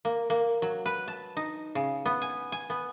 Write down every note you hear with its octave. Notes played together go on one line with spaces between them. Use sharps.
A#3
A#3
F#3
B4
A5
D#4
C#3
B3
G#5
G#5
B3